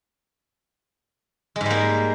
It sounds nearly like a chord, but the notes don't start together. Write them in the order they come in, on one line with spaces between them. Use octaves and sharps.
G#3 G#2 G3 A#3